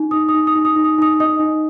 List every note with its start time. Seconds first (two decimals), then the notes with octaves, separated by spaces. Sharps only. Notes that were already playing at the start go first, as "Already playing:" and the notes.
Already playing: D#4
0.11 D#4 D#6
0.29 D#6
0.34 D#4
0.47 D#6
0.56 D#4
0.65 D#6
0.76 D#4
0.84 D#6
0.98 D#4 D#6
1.19 D#4 D#5 D#6
1.39 D#4